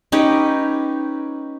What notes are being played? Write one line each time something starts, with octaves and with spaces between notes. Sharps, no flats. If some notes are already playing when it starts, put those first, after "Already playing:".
C#4 D#4 G4 B4